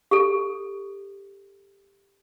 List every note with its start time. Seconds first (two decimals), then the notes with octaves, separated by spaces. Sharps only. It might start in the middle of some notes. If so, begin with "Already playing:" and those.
0.11 G4 A4